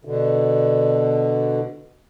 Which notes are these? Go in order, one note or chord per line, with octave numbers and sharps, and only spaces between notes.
B2 D3